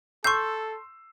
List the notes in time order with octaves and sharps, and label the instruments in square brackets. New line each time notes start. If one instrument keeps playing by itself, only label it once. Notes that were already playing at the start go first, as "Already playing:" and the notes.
[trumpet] A4 [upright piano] C6 E6 C7 [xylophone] C#6 G6